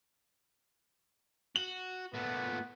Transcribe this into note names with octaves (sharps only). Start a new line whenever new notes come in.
F#4 F#7
A#2 A3 B3